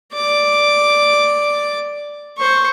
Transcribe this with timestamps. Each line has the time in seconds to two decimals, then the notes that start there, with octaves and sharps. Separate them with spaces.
0.14 D5 D6
2.38 C5 C#6